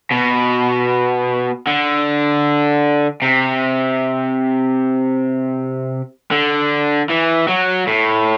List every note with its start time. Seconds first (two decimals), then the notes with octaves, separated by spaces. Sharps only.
0.11 B2
1.67 D3
3.22 C3
6.32 D3
7.10 E3
7.48 F#3
7.87 A2